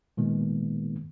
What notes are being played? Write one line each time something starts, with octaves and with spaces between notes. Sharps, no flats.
A#2 D#3 G#3 A#3 B3